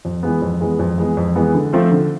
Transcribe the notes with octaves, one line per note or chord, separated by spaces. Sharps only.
F2
E3 G#3 B3
F2
E3 G#3 B3
F2
E3 G#3 B3
F2
E3 G#3 B3
D3
F3 A3 C4 F4
D3